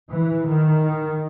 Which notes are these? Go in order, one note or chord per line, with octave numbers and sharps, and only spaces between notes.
E3
D#3